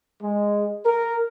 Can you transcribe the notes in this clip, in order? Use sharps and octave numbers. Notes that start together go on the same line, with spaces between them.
G#3
A#4